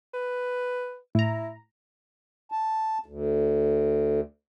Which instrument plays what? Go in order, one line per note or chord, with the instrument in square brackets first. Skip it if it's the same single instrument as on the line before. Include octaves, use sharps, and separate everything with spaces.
[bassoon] B4
[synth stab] A2 A#5 [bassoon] E4
[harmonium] A5
D2